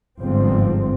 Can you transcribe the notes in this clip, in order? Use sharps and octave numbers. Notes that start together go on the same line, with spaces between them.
G1 G#2 F3 C4